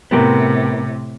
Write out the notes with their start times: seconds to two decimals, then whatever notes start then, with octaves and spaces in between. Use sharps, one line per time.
0.11 A2 C3 B3 G4 A#4